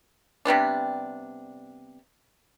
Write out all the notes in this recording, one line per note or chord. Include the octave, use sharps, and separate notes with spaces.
C3 G3 B3 D4